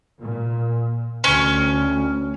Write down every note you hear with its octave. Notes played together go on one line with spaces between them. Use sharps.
A#2
D2 C#4